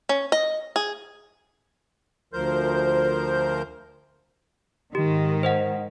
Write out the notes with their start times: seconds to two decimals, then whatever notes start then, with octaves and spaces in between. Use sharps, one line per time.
0.09 C#4
0.32 D#5
0.76 G#4
2.33 D2 F3 A#4 C5 G6
4.95 G#2 D#3 G4
5.43 C5 D#5 F#5